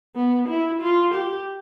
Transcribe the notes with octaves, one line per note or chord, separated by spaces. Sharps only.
B3
E4
F4
G4